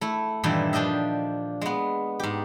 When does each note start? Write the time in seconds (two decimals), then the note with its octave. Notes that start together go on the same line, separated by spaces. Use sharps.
0.01 A3 E4
0.43 G2 A#2 D#3 E3 G3 E4
0.73 F3 D4 G4 D#5 E5
1.61 G#3 B3
2.20 G#2 G4